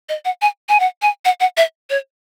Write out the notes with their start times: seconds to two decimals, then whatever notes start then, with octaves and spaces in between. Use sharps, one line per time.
0.09 D#5
0.25 F#5
0.42 G#5
0.69 G#5
0.80 F#5
1.02 G#5
1.25 F#5
1.40 F#5
1.57 E5
1.90 C#5